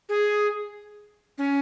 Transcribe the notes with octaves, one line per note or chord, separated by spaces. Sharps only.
G#4
C#4